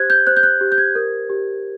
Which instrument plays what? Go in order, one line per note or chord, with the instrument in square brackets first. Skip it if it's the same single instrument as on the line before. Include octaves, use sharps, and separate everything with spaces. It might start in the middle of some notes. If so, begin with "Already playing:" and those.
Already playing: [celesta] G4 C5 F#6 G#6
G6
C5 F#6
G6
F#6
G4
G6
G#6
A#4
G4